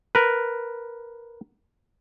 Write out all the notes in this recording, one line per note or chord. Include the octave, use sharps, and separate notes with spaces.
A#4 B4